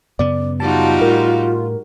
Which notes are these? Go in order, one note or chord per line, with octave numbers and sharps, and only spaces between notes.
F#2 C#3 B3 D5
G3 D#4 F4 F#4 A5
A2 A#4